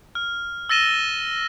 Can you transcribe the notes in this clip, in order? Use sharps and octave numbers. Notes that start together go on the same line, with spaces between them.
F6
E6 A6 A#6 D#7 E7 G7